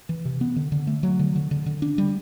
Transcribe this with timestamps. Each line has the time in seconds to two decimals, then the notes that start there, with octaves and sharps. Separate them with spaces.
0.09 E3
0.25 C3
0.41 B3
0.56 D3
0.72 D3
0.87 A3
1.03 F#3
1.19 D3
1.36 D3
1.51 D3
1.66 D3
1.82 D4
1.98 G3